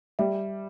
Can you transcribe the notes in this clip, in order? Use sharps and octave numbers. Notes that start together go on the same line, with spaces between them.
G3 E5